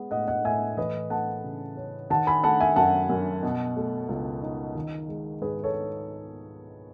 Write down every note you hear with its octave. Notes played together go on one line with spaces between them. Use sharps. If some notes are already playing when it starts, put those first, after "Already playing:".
Already playing: G#3 B3
A2 D#5 F#5
D#5 F#5
A2 E5 G#5
E3 B4 D#5
A3 F#5 A5
C#3
C#4
D#3 F#5 A5
G#5 B5
A3 F#5 A5
E5 G#5
F#2 F#5 A5
F#2
B2
A3
C#2
D#4
D#3
G#3
G#2 G#4 B4
A4 C#5